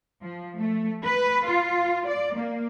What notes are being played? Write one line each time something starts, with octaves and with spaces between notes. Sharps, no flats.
F3
A3
B4
F4
D5
A#3